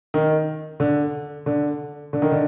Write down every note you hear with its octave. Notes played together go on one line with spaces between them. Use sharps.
D#3
D3
D3
D3
D#3
D3